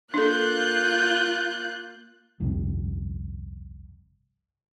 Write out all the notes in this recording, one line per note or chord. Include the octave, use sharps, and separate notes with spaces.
A#3 D4 F4 A4 F#6 G6
G1 C2 F2